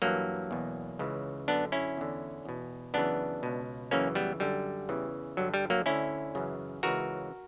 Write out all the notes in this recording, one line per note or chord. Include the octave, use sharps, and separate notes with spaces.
G2 E3 F#3 A#3
E2 B2
C#2 C#3 E3
F#2 D3 B3 D4
C#4 E4
E2 D3
E2 B2
F#2 C#3 E3 B3 D4
C#2 B2
F#2 C#3 E3 A#3 C#4
G3 B3
F#2 D3 G3
E2 C#3 E3
G2 D3 F#3
G3
F#3 A#3
D2 D3 C#4 E4
F#2 C#3 E3
C#2 C#3 E3 F#4 A#4